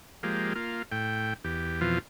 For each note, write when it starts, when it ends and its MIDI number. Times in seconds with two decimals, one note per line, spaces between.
0.23 0.53 53
0.23 0.53 56
0.23 0.53 58
0.23 0.53 67
0.55 0.83 58
0.55 0.83 65
0.92 1.34 45
0.92 1.34 79
1.44 1.80 40
1.44 1.80 67
1.81 1.99 41
1.81 1.99 47
1.81 1.99 52
1.81 1.99 53
1.81 1.99 65